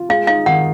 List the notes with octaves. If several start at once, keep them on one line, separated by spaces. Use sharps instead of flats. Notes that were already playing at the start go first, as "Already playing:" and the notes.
Already playing: F4
G#3 F5
D#4 F5
D#3 F#5